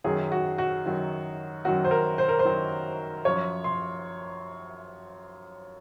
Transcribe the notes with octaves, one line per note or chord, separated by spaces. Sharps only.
F#2 D#3 F#3 G#4
F#4
F#4
F#2 D#3 F#3
F#2 D#3 F#3 F#4
C5
A#4
C5
A#4
C5
F#2 D#3 F#3
F#2 F3 C#5
C6